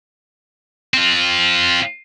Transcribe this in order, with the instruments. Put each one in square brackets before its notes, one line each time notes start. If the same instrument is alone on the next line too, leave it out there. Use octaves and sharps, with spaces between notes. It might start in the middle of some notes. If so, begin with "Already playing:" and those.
[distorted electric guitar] C4 F4